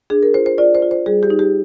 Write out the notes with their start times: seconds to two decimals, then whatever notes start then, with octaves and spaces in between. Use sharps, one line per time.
0.10 D4 G#4
0.23 A#4
0.34 F4 C5
0.46 C5
0.58 F4 D5
0.75 C5
0.82 F4
0.91 C5
1.06 G3 G#4
1.23 G4
1.30 D#4
1.39 G4